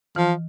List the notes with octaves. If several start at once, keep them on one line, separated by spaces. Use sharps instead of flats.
E3 F3